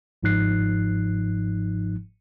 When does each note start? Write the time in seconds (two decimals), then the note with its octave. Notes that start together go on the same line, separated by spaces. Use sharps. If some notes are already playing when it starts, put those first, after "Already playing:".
0.23 G1 G#2 F3 D#4 F#6 C7